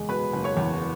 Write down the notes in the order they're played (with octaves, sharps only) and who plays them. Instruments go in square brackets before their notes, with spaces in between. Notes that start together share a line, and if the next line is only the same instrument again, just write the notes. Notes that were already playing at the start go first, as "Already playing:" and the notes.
Already playing: [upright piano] F#1 E2 G#3 G#4
B2 B4 B5
F#1
C#5 C#6
E2